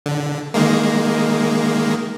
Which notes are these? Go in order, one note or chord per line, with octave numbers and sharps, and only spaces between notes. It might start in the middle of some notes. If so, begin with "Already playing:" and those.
D3
D#3 G#3 A#3